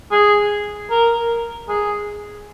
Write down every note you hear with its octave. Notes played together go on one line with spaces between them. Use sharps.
G#4
A#4
G#4